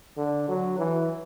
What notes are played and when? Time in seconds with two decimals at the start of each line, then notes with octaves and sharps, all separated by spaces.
0.17 D3
0.48 F#3
0.78 E3